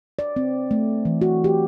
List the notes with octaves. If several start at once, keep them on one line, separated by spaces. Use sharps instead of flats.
D5
C4
A3
E3
F#4
G4